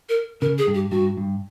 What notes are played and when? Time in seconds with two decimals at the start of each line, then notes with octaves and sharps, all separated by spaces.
0.09 A#4
0.41 C#3 A#4
0.58 G#4
0.67 G2
0.75 G4
0.91 G2 F#4
1.17 G2